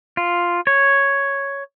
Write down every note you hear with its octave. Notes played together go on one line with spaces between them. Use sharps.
F4
C#5